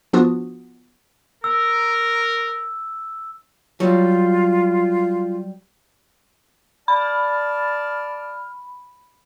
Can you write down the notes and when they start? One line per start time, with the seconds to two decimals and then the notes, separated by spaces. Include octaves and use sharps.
0.13 F3 B3 D4 F4 F#4 D#6
1.44 A#4 E6
3.80 F#3 G3 F4
6.88 D5 A5 B5 F6